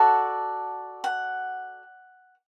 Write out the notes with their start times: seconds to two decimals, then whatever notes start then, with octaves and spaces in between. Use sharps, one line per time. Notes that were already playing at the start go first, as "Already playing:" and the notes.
Already playing: F#4 A4 D5 F#5 A5
1.04 F#5